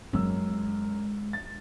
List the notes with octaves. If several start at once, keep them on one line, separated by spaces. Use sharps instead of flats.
F#2 G#3 E6
A6